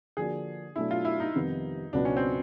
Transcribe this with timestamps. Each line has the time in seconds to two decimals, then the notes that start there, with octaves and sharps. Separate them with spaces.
0.17 D3 F3 A#3 D4 F#4 G#4
0.76 B2 F#3 A3 D4 E4
0.91 F4
1.05 E4
1.20 D#4
1.35 F2 C3 D#3 G3 B3
1.93 C#2 B2 F#3 B3 D4
2.05 C#4
2.17 C4